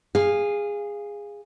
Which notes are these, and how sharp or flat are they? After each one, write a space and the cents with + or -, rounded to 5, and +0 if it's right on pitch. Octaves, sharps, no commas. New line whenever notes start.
G#4 -15 F5 +0